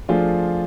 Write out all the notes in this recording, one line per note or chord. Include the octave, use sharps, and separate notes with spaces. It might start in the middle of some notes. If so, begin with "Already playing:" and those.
F3 A3 D4 F4 G#4